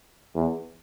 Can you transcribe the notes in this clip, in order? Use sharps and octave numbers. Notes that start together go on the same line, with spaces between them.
E2